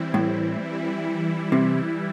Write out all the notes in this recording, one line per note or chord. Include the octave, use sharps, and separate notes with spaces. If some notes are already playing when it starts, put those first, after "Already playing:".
Already playing: E3 G3 C4 E4
A2
E3 G3 E4
C3